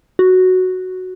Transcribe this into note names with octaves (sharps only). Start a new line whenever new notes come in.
F#4